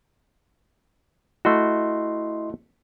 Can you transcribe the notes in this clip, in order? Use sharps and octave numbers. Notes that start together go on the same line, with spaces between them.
A3 E4 F#4 D#5 C6